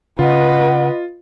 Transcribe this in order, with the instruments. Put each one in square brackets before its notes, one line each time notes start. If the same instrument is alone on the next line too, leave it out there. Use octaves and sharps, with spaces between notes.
[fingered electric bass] C#3 [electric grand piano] F4 [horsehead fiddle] B4 D#5 [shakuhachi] F#5